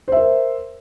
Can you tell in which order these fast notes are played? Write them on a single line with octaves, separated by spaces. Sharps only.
C5 E5 A#4